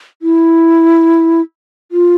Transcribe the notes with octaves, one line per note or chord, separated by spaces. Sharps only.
E4
F4